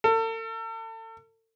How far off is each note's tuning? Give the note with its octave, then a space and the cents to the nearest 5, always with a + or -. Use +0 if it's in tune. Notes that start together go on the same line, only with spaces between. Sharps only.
A4 +40